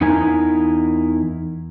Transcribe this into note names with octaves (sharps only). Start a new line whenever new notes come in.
E2 D#4 E4 A#4 G#5